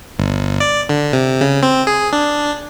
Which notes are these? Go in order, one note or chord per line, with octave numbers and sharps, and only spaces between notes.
G1
D5
D3
C3
C#3
C4
G#4
D4